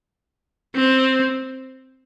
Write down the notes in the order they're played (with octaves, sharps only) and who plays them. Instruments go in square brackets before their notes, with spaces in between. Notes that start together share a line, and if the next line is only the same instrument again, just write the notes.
[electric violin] C4